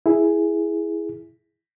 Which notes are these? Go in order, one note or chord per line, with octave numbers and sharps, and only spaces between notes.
E4 G#4